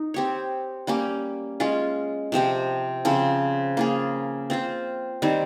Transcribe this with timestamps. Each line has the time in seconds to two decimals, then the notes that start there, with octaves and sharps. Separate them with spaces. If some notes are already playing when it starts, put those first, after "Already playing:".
Already playing: D#4
0.14 C4 G4 C#5
0.87 G3 A#3 C#4 G4
1.60 G#3 C#4 F4
2.32 C3 F3 C4 G4
3.05 C#3 F3 C4
3.77 A#3 F4 G#4
4.50 C4 F4 C5
5.22 D#3 G3 C4